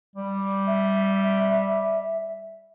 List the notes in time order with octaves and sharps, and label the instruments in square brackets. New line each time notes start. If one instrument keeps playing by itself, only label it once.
[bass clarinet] G3
[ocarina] E5